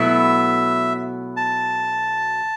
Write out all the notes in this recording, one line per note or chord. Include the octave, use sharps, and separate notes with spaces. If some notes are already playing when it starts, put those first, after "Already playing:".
Already playing: B2 F#3 A3 E4 E5
A5